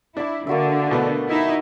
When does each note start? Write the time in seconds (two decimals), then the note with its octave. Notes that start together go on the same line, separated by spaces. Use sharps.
0.17 D4 E4 D5 D6
0.47 D3 A#3 F#4 E5
0.91 B2 A3 B3
1.28 D#4 E4